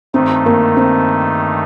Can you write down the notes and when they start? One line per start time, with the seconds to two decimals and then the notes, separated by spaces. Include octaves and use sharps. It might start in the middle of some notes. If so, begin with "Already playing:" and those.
0.14 G2 D#3 A3 C4 D#4
0.46 A#3
0.77 C4